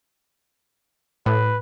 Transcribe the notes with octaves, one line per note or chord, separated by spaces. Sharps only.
A2 B4